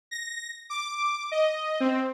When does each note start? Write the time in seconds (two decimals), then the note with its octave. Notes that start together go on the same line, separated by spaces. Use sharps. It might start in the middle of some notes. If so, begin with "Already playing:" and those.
0.11 A#6
0.70 D6
1.32 D#5
1.80 C4